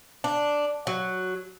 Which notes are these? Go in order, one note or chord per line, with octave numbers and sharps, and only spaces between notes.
D4
F#3